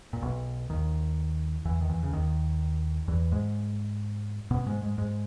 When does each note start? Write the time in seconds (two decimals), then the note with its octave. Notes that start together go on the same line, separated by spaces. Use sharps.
0.13 A#2
0.22 B1 B2
0.70 D#2 D#3
1.65 E2 E3
1.81 D#3
1.89 E2 E3
2.03 C#3
2.13 D#2 D#3
3.08 E2 E3
3.31 G#2 G#3
4.51 B2 B3
4.66 G#2 G#3
4.82 G#2 G#3
4.98 G#2 G#3